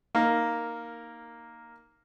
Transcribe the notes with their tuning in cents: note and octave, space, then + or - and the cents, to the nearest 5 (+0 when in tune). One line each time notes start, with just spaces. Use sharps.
A#3 +0 D#4 +0 A#4 -10